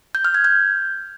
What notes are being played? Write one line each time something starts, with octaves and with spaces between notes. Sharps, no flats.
G6
F6
G#6
G6